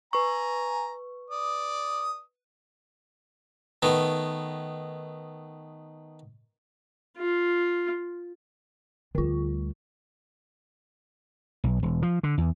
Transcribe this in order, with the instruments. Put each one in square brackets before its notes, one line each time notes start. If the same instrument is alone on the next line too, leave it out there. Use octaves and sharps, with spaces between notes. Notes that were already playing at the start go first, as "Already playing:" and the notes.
[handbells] B4 C#6 [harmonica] G#5 A#5
[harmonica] D5 D#6
[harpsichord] D#3 A3 B3
[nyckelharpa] F4
[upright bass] D2 G3 [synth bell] D3 F4
[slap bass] B1
E1
F3
D3
E2